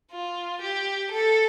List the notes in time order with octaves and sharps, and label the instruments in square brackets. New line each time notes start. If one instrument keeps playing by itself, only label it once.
[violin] F4
G4
A4